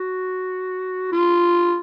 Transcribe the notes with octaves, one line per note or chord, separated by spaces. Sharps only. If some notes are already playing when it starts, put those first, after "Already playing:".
Already playing: F#4
F4